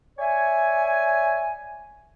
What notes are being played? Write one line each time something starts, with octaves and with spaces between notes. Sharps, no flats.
C#5 D5 E5 G#5